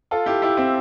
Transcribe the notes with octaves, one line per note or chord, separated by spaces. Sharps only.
F4 A4
E4 G4
E4 G4
C4 E4